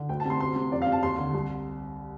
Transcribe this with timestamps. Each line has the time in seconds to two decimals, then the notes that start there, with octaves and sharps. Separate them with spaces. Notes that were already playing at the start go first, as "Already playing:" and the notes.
Already playing: D3
0.09 D2 G5
0.20 A5
0.25 C3 C6
0.40 D2 C6
0.56 C3
0.72 F2 D5
0.82 F5
0.87 C3
0.92 A5
1.03 D#2 C6
1.18 D3
1.34 C2